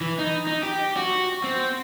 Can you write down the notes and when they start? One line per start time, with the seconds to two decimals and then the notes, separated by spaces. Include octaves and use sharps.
0.01 E3
0.19 D#4
0.47 D#4
0.63 G4
0.97 F#4
1.44 C4